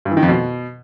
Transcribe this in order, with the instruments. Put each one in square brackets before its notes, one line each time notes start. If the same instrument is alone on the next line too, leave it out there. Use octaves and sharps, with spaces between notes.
[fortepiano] G2
E3
D#3
F2
B2